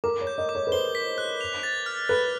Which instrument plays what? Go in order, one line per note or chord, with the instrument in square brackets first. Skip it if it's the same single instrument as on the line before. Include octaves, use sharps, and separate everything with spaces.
[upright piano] A#4 [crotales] D6
[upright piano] C#5
[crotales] G6
[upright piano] D#5
[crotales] D6
[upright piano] C#5
B4
[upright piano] C5 [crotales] G7
[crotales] B6
F#6
F7
A6
F6
[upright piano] B4 [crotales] F#6